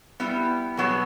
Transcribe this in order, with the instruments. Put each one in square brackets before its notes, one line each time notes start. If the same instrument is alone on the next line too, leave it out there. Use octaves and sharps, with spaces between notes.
[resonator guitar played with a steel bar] G3 B3 E4
B2 F#3 B3 F#4